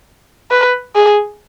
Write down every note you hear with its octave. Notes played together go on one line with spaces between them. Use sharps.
B4
G#4